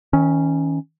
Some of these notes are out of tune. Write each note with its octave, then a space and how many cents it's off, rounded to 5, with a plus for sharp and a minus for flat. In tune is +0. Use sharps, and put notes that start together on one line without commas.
D#3 +45 C#4 +0